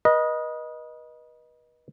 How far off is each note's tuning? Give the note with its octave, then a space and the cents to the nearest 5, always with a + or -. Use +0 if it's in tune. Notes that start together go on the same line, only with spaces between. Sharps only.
B4 -35 D#5 +0